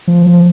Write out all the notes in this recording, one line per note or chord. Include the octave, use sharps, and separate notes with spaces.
F3
F3